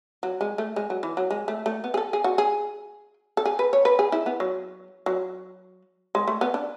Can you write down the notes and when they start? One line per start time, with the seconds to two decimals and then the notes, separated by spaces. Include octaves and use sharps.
0.23 F#3
0.41 G#3
0.58 A3
0.76 G#3
0.90 F#3
1.03 E3
1.17 F#3
1.30 G#3
1.48 A3
1.66 A3
1.84 B3
1.94 G#4
1.97 A4
2.13 G#4
2.24 F#4
2.38 G#4
3.37 A4
3.45 G#4
3.59 B4
3.73 C#5
3.85 B4
3.99 G#4
4.12 E4
4.26 B3
4.40 F#3
5.06 F#3
6.15 G#3
6.28 A3
6.41 B3
6.54 D4